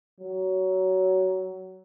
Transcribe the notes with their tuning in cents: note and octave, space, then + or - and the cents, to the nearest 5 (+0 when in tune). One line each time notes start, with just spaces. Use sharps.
F#3 +20